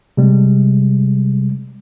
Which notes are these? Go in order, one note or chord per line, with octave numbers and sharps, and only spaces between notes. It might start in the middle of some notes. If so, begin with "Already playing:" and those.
C3 G3 G#3